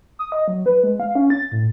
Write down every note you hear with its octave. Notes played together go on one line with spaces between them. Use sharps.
D#6
D#5
F#3
B4
G#3
F5
C#4
A6
A2